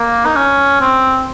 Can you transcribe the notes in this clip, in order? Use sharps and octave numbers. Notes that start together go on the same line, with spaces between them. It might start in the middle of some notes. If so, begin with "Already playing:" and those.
Already playing: A#3
D#4
C#4
C4